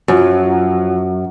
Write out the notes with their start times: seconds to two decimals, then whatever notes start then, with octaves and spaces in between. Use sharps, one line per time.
0.08 F#2 F3 F#3